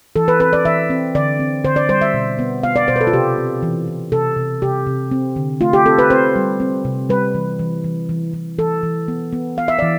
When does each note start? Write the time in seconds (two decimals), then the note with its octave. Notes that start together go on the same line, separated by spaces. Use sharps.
0.16 E3 A4
0.28 B4
0.40 C4 B4
0.53 D5
0.65 E3 E5
0.90 C4
1.15 D3 D5
1.39 C4
1.64 D3 C5
1.76 D5
1.89 G3 C5
2.01 E5
2.14 B2
2.39 B3
2.63 B3 F5
2.76 D5
2.88 B2 C5
2.96 B4
3.01 A4
3.07 F4
3.13 C3 G4
3.38 C4
3.63 E3
3.88 E3
4.12 C3 A4
4.37 C3
4.62 C3 G4
4.87 C3
5.11 C4
5.36 D3
5.61 A3 F4
5.73 G4
5.85 C4 A4
5.99 B4
6.10 C4 C5
6.36 G3
6.60 C4
6.85 C3
7.09 G3 B4
7.35 E3
7.59 E3
7.84 E3
8.09 E3
8.34 E3
8.59 E3 A4
8.83 E3
9.08 B3
9.33 B3
9.58 B3 F5
9.68 E5
9.79 E3 D5